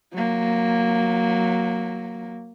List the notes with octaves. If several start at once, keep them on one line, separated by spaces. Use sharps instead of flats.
F#3 A#3